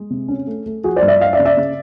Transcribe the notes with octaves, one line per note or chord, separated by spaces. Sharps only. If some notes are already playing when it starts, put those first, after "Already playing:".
Already playing: G#3 G#4
C3
C#4
A3
A3
F3 F#4 G#4
C5 D5
G2
D5 E5
D4 D#5 F5
D5 E5
C#3
D5 E5
C#3